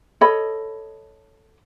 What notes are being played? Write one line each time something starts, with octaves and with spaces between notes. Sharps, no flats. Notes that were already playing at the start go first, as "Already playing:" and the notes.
A4 C#5 D#5 B5